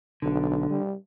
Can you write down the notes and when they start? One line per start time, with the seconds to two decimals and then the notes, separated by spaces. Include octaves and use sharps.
0.22 B1 D3
0.70 G3